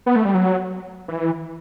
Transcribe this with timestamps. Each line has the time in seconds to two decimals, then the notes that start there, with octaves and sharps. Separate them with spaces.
0.06 B3
0.16 A3
0.25 G3
0.35 F#3
1.08 E3